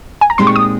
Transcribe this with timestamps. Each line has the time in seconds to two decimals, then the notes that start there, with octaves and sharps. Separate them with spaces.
0.21 G#5
0.30 A#5
0.38 A#2 G#3 C4 D#4 G4 C6
0.47 C#6
0.56 D#6